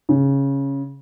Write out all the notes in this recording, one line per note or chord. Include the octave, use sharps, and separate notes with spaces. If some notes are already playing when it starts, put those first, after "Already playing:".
C#3